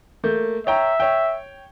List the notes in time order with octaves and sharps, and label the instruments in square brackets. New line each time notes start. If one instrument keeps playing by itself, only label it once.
[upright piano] A3 A#3 G6
[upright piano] C#5 G5 A#5 [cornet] E5
[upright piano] C#5 G5